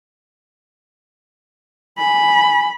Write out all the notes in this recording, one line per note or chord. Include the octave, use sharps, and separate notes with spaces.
G#5 B5